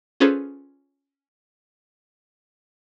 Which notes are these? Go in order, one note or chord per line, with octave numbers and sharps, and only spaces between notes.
C#4 F4 G#4 A4 B4 C5